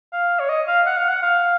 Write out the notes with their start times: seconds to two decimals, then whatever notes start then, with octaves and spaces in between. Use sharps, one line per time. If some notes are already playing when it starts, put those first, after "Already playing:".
0.13 F5
0.40 C#5
0.49 D#5
0.68 F5
0.86 F#5
0.97 F5
1.09 F#5
1.22 F5